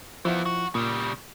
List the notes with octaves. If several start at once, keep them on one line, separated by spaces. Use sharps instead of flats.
E3 F3 B3 E4 F4
F#4
A#2 C#3 G3